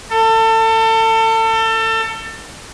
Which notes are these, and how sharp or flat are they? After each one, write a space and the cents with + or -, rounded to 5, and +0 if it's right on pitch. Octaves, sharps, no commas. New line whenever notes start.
A4 +30